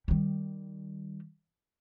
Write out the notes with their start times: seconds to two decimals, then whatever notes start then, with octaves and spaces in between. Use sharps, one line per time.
0.08 D#3 G3